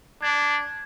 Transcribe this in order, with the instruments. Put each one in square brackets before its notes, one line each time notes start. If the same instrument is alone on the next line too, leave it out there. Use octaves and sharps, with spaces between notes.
[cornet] D4 [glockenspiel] G#6